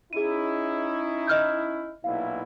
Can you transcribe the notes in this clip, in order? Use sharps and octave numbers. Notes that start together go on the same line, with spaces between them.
C#4 D#4 E4 G#4 D#7
D#5 F6 G6
B1 A#2 E4 F5